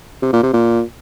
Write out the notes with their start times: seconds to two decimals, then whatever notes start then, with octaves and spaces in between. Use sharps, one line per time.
0.22 C3
0.33 A#2
0.43 C3
0.53 A#2